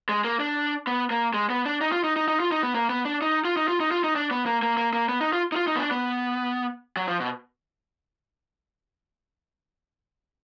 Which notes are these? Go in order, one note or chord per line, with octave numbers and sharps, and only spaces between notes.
G#3
A#3
D4
B3
A#3
G#3
B3
D4
D#4
F4
D#4
D#4
D#4
F4
D#4
B3
A#3
B3
D4
D#4
F4
D#4
F4
D#4
F4
D#4
D4
B3
A#3
A#3
A#3
A#3
B3
D#4
F4
D#4
F4
D#4
B3
D4
B3
F#3
F3
B2